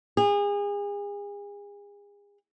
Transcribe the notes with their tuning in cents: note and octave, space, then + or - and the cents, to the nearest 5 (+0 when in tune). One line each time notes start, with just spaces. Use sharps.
G#4 -35